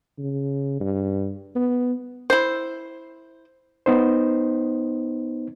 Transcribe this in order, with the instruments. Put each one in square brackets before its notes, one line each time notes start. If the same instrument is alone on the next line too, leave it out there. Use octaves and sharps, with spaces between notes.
[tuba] C#3
G2
B3
[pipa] E4 C5
[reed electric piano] B3 D#4 C5